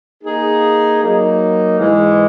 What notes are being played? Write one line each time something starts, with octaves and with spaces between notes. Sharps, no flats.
A#3 D#4 G#4
F#3 A#3 D#4
G#2 E3 G#3